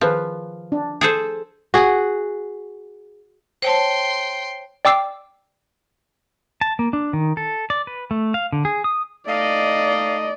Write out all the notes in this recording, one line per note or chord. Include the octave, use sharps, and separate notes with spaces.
D#3 F3 G#4 B4
D4
G#4 A4 C5
F#4 G#4
C5 C#5 G5 A5 C6
D5 G5 D6 E6 C7
A5
A#3
D4
D#3
A4
D5
B4
A3
F5
D3
G#4
D#6
A3 D#4 D5 D#5 F5